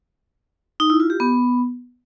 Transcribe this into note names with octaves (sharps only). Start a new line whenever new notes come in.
D#4
E4
F4
G4
B3